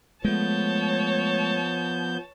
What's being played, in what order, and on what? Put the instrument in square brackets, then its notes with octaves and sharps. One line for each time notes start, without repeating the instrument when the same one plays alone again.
[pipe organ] F3 B3 G6 [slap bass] G#3 A3 [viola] C#5 A5